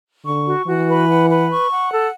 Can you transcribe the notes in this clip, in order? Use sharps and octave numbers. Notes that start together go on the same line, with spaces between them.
D3 C#6
F#4
E3 F#4
B4
F#5
B4
C#6
F#5
A4